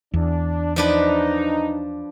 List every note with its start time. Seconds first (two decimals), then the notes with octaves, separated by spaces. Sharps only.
0.14 E2 D4
0.76 F3 D4 D#4 B4